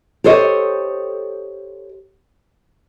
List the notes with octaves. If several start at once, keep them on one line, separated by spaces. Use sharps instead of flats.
G4 A4 C5 C#5 D#5